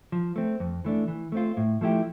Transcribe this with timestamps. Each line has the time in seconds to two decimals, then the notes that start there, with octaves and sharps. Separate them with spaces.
0.12 F3
0.36 A3 C4
0.60 F2
0.85 E3 A3 D4
1.08 E3
1.32 A3 C4 F4
1.57 A2
1.81 F3 A3 E4 G4